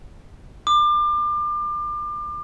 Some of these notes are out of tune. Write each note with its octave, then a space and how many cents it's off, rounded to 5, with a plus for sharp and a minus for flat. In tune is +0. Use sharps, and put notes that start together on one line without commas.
D6 +30